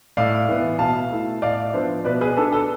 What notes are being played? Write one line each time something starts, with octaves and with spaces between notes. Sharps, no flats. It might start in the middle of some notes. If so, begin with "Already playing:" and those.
A2 D5 F5
E3 B3
B2 F5 A5
A3 E4
A2 D5 F5
F3 B3 D4 C5 E5
B2 B4 D5
G#4 B4
B3 D4 A4
A4